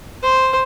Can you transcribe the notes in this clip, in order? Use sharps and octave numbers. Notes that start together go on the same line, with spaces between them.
C5